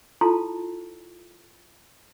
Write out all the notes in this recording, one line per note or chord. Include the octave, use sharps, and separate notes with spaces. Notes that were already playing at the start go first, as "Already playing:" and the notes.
E4 F4 A4 A5 A#5 C6